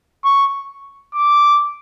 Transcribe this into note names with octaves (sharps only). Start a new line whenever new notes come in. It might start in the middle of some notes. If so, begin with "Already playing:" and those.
C#6
D6